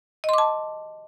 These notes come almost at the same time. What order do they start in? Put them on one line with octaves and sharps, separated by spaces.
D#5 C6 D6 A5